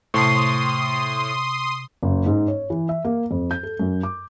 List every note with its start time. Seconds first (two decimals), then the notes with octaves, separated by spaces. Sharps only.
0.14 A2 C3 A5 C6 C#6 D#6 C7
2.03 F#1
2.26 G#2
2.48 C#5
2.70 E3
2.89 E5
3.05 A#3
3.31 F2
3.51 G6
3.63 A4
3.79 F#2
4.03 D6